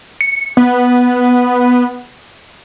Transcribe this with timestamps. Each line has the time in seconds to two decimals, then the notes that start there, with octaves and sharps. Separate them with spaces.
0.21 C#7
0.57 B3